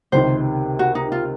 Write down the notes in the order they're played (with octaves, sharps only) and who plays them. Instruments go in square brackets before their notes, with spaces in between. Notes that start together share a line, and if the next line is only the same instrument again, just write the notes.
[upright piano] C#2 C3 D#3 [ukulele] C5
[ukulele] F#4
D#4
F4